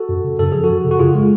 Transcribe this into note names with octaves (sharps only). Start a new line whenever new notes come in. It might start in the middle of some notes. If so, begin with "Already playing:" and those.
Already playing: F#4 A4
F#2
C#3
F#2 A4
F3 G#4
F#4 A4
F#2
C#3
F#4
F#2 F4 G#4
G#3